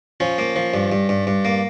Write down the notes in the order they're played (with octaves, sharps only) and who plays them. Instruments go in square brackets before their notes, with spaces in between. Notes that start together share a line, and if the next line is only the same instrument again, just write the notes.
[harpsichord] F3 C#4
A#3
F3
G2
G2
G2
G2
A#3